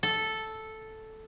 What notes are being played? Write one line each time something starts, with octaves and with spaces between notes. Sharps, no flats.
A4